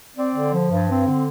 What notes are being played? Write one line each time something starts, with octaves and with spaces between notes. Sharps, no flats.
C4 D5
D3
F3
G2
C4
D3